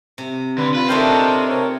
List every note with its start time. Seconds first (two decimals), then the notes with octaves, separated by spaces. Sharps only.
0.18 C3
0.58 D3 B4
0.75 F4 B4
0.89 A3 D4 D#4 F4 A#4 C5 E5 G5
1.49 A#4 C#5